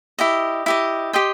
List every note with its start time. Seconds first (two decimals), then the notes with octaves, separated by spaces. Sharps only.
0.19 E4 G4 D#5
0.66 E4 G4 D#5
1.13 G4 D#5 G5 C6